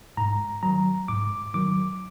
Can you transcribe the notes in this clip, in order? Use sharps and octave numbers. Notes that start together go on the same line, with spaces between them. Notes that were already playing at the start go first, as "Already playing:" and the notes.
G#2 A#5
D#3 F#3 A#5
G#2 D6
D#3 F#3 D6